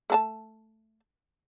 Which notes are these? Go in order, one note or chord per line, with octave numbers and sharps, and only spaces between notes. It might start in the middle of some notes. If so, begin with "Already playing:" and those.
A3 A4 A5